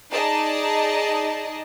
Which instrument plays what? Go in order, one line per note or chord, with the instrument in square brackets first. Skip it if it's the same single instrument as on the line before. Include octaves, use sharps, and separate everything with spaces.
[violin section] D#4 G#4 D5 D#5 A5